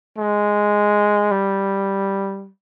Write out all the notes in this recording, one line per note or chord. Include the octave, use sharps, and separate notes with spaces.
G#3
G3